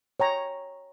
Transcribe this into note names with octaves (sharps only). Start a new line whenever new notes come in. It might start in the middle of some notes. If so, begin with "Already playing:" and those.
C#5 G5 A#5